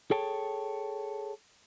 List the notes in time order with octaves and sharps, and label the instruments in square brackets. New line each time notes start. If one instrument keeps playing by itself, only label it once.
[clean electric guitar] G#4 A4 C#5 G5 A5